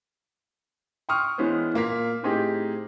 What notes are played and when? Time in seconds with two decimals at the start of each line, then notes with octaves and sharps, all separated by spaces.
1.09 G5 C6 C#6 D#6 F6
1.38 E3 G#3 B3 C5 C#5
1.74 A#2 A#3 F5 B6
2.23 A2 C4 D#4 G4 G#4